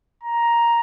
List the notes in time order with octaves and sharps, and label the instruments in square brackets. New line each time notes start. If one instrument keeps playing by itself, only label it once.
[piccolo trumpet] A#5